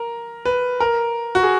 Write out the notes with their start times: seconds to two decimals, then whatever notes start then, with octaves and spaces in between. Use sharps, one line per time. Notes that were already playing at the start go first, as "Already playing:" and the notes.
Already playing: A#4
0.45 B4
0.80 A#4
1.35 F#4
1.43 G#4